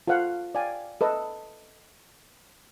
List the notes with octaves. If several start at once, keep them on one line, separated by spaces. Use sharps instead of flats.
F4 A4 C5 F5 F#5
D5 F5 G5 G#5
A4 B4 D#5